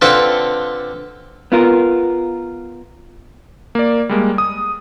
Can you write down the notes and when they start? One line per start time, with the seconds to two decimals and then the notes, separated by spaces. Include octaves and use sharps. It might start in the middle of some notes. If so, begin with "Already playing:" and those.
0.01 D3 C4 F4 A4 B4 D5
1.52 B3 F4 A#4
3.75 A#3 D5
4.09 G3 G#3 A#3
4.38 D#6